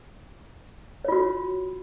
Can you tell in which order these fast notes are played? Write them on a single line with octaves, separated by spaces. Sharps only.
C#5 F4 F#4